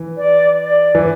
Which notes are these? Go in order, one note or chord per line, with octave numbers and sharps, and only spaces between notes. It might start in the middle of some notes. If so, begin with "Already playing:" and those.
Already playing: E3
D5
D5
E3